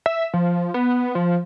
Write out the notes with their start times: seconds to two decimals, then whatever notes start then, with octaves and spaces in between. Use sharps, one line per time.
0.06 E5
0.34 F3
0.74 B3
1.15 F3